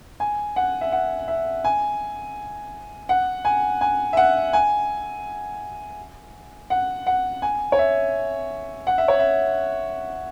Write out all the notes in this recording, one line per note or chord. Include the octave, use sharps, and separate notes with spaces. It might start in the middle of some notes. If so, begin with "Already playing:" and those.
G#5
F#5
E5
F#5
E5
G#5
F#5
G#5
G#5
E5
F#5
G#5
F#5
F#5
G#5
C#5
E5
F#5
E5
C#5
E5